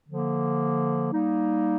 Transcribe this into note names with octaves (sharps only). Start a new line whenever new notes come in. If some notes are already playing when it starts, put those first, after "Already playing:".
D3 F3 A#3
G3 A#3 D#4